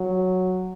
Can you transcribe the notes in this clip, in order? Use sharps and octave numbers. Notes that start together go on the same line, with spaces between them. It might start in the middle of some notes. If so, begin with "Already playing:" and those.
Already playing: F#3